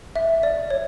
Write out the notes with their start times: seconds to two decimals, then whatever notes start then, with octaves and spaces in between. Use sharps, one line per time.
0.16 E5
0.43 D5
0.70 C#5